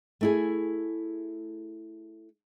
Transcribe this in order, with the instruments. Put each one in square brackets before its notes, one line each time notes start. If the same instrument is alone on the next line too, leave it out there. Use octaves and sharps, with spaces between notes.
[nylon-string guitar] A3 E4 G#4